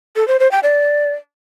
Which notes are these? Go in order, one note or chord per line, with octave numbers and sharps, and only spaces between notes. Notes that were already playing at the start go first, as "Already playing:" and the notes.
A4
C5
C5
G5
D5